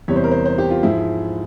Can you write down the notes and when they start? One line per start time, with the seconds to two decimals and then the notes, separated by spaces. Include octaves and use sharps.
0.08 E2 C3 G3 C#5
0.16 C5
0.24 A#4
0.32 C5
0.46 C5
0.58 G4
0.71 F4
0.83 G#2 F3 G#3 E4